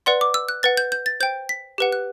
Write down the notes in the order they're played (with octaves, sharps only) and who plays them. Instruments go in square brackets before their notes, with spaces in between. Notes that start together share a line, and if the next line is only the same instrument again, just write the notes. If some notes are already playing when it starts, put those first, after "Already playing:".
[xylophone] B4 D5 F#5 C6
D6
E6
F#6
B4 F#5 A6
G6
G6
A6
C5 G5 G6
B6
G4 B4 F#5
F#6